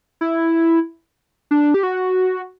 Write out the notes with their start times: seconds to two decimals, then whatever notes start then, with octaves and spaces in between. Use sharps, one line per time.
0.21 E4
1.51 D4
1.74 G4
1.83 F#4